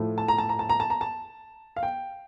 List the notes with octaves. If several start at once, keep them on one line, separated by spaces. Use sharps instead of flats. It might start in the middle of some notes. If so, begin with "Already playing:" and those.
Already playing: A2 F3 A3
A5
A#5
A5
A#5
A5
A#5
A5
A#5
A5
F5
G5